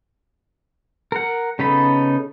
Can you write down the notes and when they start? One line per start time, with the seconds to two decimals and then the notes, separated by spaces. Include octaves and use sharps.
1.12 A#4 F#5
1.59 C#3 B3 D#4 A4 B5